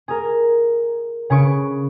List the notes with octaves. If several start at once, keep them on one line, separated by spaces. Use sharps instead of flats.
G#4 A#4
C#3 G#4 B4 C#6 D7